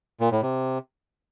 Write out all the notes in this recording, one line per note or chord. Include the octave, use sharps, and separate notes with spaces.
A#2
A2
C3